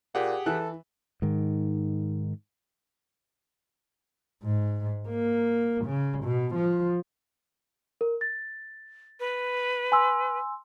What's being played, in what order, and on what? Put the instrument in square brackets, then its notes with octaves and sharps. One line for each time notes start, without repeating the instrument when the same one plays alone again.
[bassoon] A#2 [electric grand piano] G4 G#4 F#5
[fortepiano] E3 F#6 [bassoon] A4
[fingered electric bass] G#2 D#3
[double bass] G#2
A#3
C#3
B2
F3
[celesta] A#4
A6
[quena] B4
[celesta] G#5 C6 E6